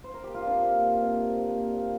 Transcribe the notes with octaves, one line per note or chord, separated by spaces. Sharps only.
C5
A#4
G4
F4
C3 D4
A#3
C3
C3
C3
A#3
A#3
A#2